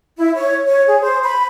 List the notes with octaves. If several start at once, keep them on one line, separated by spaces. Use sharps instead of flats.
E4
C#5
C#5
G#4
C5
B5